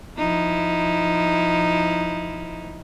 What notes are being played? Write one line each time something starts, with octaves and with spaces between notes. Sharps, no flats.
F3 D#4 E4